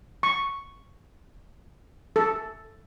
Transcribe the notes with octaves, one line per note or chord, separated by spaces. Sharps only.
C#6
A4